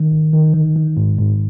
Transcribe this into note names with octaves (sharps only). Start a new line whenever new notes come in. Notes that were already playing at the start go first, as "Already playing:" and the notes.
Already playing: D#3
G#1
D#3
D#3
D#3
G#2
G#2